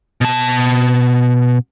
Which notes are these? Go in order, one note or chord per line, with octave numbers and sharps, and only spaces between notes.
B2 A5